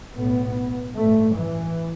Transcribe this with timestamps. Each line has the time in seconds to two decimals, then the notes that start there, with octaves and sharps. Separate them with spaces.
0.15 B1 A2 B3
0.95 A1 G2 A3
1.35 E3